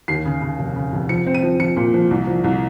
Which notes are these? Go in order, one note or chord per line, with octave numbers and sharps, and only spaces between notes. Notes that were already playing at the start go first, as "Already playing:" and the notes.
D#2 C7
C#3
C#3
F1
C#3
F1
F3 C#7
C4
D#7
F3
F3 C#7
A#2
F3
C2
F3
C2